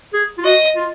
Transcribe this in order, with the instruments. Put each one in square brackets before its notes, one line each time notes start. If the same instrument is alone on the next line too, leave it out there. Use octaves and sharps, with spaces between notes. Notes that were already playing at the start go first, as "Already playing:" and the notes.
[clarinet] G#4
F4
[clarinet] F#4 [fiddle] D#5
[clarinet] F4